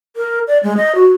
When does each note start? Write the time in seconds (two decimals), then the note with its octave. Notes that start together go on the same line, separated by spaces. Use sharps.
0.16 A#4
0.47 D5
0.63 G#3
0.77 D#5
0.95 F#4